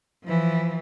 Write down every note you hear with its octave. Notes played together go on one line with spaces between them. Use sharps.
E3 F3